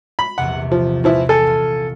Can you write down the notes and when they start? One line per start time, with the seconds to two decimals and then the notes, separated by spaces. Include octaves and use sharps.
0.19 B5
0.38 A#1 E2 C3 F#5
0.72 F3
1.04 E3 F3 E4
1.29 A4 G#5
1.47 F4